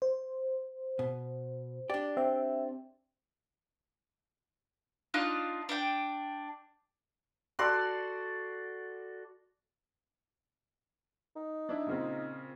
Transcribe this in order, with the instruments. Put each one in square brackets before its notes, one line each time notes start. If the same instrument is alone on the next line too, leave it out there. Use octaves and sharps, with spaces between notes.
[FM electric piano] C5
[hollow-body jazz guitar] B2
[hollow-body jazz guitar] D4 G4 [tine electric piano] D5
[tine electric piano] C4 [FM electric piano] E5
[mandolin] D4 D#4 F4 F#6
D4 G5
[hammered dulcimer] F#4 A4 D5 C6
[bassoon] D#4
[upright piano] D4 E4
A#2 C#3 C4